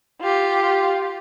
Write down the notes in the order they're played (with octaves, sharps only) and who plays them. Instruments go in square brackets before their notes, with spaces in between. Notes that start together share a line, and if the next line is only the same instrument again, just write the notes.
[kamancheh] F4 G4